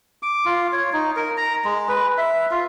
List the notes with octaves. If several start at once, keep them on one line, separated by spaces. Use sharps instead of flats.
D6
F4
C#5
D#4
A#4
A#5
G#3
B4
E5
F4